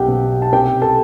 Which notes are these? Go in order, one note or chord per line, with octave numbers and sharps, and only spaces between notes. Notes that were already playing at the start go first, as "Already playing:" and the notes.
Already playing: B1 G4 F#5 G5
B2
A5
C2 G4 G5
A4 A5